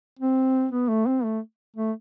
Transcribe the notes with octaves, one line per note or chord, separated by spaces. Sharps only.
C4
B3
A3
C4
A3
A3